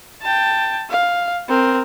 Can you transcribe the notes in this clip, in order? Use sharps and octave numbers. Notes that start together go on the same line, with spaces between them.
G5 A5
F5
C4 A#4